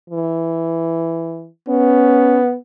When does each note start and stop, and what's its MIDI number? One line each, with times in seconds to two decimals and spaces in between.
0.10 1.48 52
1.69 2.57 59
1.69 2.39 61